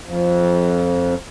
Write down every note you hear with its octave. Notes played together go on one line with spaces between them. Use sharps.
F2